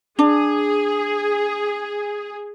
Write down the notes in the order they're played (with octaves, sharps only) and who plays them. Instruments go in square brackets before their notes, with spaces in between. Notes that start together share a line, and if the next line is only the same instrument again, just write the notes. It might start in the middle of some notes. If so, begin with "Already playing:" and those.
[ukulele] D4 [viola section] G#4